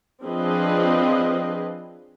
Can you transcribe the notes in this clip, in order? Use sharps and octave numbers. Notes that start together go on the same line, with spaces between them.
F3 C4 D4 G#4 B4 D#5